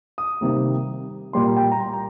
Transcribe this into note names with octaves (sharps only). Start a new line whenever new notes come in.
D#6
C3 D#3 G3 A#3
A#2 G3 A#3 C6
A#5
G5
A#5
C6
A#5